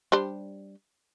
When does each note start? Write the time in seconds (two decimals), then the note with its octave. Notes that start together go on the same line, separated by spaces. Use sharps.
0.12 G3 D4 C5